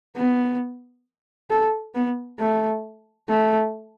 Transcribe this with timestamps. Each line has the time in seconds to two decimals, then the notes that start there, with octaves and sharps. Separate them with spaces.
0.16 B3
1.50 A4
1.95 B3
2.39 A3
3.29 A3